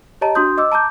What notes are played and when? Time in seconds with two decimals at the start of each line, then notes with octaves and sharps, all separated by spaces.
0.21 G4 C#5 D#5 A5 A#5
0.35 D4 F#4 C6 D#6 G6
0.57 D#5 D6 E6
0.72 A5 A#5 D6 G6